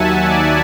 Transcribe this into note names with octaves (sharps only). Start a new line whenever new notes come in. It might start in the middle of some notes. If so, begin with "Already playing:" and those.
Already playing: D#2 D#3 F#3 E5 F#5 G#5 A5
D5